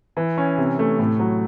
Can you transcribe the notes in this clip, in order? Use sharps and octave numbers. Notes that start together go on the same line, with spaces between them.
E3
C#4
C3
A3
A2
F#3